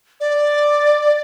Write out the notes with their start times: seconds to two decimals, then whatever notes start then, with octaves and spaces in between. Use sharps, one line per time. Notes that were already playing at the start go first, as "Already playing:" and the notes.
0.20 D5